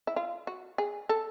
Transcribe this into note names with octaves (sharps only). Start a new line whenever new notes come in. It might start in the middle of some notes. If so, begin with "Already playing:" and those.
E4
F4
F#4
G#4
A4